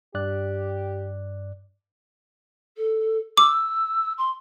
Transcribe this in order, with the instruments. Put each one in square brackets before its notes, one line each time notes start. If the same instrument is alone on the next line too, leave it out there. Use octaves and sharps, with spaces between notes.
[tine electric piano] G2 D5 F#6 [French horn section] G4
[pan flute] A4
[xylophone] D6 [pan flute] E6
[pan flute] C6